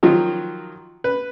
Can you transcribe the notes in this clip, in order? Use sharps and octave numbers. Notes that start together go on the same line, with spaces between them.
D#3 F3 F#3 F4
B4